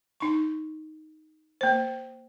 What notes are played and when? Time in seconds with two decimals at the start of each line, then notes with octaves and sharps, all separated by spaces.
0.20 D#4 C#6
1.61 A#3 C5